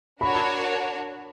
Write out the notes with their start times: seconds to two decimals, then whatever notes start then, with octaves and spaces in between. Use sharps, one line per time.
0.21 D4 F#4 A#4 C#5 B5